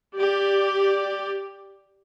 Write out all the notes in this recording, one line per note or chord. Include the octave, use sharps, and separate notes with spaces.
G4 D5